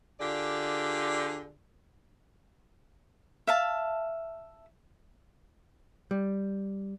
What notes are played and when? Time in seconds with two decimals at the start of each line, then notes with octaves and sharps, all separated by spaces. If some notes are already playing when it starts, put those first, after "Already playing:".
0.19 D3 F4 G4 G#4 D5
3.47 E5 F5 A5
6.11 G3